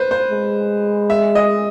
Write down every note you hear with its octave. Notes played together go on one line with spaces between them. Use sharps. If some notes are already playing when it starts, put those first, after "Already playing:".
Already playing: B4 C5
C5
G#3
E5
D#5